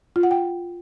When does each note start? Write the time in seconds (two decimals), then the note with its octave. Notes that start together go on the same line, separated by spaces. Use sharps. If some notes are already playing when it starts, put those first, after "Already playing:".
0.16 F4
0.23 F#5
0.31 G5